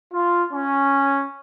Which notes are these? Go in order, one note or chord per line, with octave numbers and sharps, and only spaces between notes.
F4
C#4